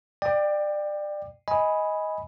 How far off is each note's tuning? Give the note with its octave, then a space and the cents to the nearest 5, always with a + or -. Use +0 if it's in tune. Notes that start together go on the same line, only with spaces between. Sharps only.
D5 +25 G5 +10
D#5 +15 G#5 +0 B5 -5